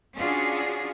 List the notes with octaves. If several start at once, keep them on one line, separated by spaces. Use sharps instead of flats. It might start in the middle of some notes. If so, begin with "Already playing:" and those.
C#4 D4 F4 F#4 G#4